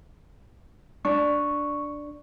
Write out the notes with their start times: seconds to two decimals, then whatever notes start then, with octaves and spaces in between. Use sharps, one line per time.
1.05 D4 C#6